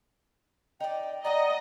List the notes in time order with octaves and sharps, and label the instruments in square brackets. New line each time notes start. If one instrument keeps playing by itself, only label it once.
[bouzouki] D#4 D5 [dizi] G5
[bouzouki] D5 F#5 A5 [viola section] D#5 [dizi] A#5